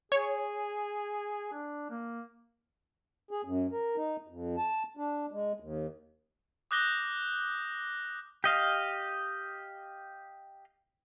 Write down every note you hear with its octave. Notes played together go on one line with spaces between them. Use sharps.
G#4 C#5
D4
A#3
G#4
F#2
A#4
D#4
F2
A5
D4
G#3
D#2
D6 D#6 F#6 G6 A#6 G7
G4 D#5 F5